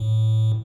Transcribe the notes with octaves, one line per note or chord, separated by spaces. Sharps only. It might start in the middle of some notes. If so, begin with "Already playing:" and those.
Already playing: A2